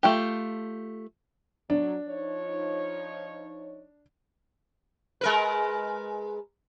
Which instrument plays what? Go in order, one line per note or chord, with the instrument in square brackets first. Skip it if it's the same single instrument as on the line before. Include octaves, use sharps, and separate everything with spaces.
[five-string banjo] A3 F4 G4
[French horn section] F#3 [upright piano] D4
[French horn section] F3 D#4 C#5
[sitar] G#3 A#4 B4